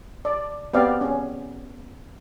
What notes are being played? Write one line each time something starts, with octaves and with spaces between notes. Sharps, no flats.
D5
B3 C4 G4 D5 F5
C#4